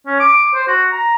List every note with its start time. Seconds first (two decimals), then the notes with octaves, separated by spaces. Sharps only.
0.07 C#4
0.20 D6
0.54 C5
0.68 F#4
0.92 A#5